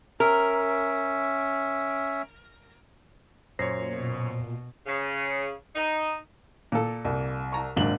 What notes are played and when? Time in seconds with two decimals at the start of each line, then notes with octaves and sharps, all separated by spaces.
0.20 C#4 A#4 E5
3.59 F#2 A#2 C5 C#5 A#6 C7
3.93 B2
4.86 C#3
5.75 D#4
6.72 A#2 A#3 A4
7.05 C2
7.52 A5 A#5 C#6
7.76 G#1 C#2 F#2 A#2 D4 F#7